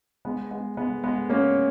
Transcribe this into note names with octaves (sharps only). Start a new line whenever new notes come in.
G#3 B3
G#3 B3
G#3 B3
G#3 B3
A#3 C#4